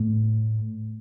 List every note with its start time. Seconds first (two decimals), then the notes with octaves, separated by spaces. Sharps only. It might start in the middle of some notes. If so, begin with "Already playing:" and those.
Already playing: A2